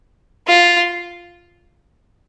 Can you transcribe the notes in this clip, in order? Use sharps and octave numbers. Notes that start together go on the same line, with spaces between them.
F4